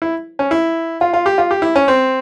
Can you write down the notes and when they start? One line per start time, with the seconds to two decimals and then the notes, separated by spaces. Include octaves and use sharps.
0.02 E4
0.39 C#4
0.51 E4
1.01 F4
1.14 F4
1.26 G4
1.38 F4
1.51 G4
1.62 E4
1.76 C#4
1.88 C4